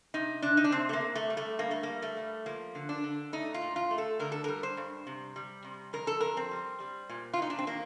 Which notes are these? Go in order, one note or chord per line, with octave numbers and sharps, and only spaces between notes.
C3 D#4
C3 D4
D#4
D4
C3 C4
A3
A#3
C3
A3
G3
A3
G2 A#3
A3
G3 A#3
A3
G3
F3 A#3
D3
D4
D3
A3 D#4
F4
A#2
F4
A3
A4
D3 A#4
A4
G3 A#4
C5
G2
C3
G3
C3
F2 A#4
A4
F2 A#4
C4
G3
G3
A#2
F4
A#2 D#4
D4
C4
D#3 A#3